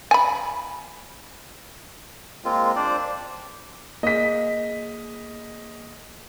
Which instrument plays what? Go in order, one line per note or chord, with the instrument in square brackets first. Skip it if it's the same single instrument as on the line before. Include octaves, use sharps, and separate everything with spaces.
[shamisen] G#5 B5
[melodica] G#3 A#3 C4 F4
D4 C5 D5
[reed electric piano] A#3 G#4 [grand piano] D#5 B6